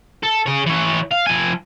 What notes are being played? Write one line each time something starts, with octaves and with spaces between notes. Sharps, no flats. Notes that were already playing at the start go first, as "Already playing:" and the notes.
A4
G#4 C#5
E3 C#5
F5
F3 G#5